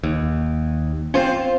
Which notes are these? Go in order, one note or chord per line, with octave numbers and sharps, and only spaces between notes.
D#2
C4 C#4 F4 C5